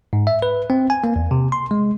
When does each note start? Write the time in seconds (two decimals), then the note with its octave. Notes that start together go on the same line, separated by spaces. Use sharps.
0.13 G#2
0.27 E5
0.42 B4
0.70 C4
0.90 G#5
1.04 A#3
1.16 E2
1.31 C3
1.52 C6
1.71 G#3